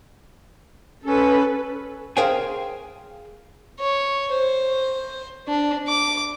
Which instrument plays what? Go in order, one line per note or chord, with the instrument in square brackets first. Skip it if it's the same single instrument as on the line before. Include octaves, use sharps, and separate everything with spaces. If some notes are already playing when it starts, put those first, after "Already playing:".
[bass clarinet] C#4 [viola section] A4 B4
[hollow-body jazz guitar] G#4 A#4 C5 F5 G5 G#5
[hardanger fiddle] C#5
C5
D4
D6